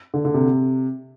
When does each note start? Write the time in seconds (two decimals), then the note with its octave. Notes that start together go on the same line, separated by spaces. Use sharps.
0.14 D3
0.25 D3
0.34 C3